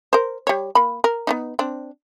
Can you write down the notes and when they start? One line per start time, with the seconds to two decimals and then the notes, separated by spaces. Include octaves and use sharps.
0.13 A#4 C5
0.47 G3 C#5
0.75 A#3 B5
1.04 A#4
1.27 B3 D4 D#4
1.59 C4 D4